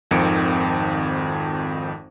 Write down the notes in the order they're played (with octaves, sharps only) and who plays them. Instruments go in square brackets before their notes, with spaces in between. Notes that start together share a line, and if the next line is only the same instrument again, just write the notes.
[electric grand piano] G#1 F2 D#3 C4 C#7 D7